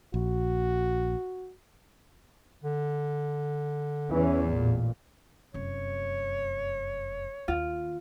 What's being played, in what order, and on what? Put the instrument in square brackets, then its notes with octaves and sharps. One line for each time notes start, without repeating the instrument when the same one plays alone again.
[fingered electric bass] A#1 [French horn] F#4
[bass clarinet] D3
[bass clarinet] E2 [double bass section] E3 C#4
[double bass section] A1 A#2
[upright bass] F1 F#2 [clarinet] C#5
[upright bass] D#2 [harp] F4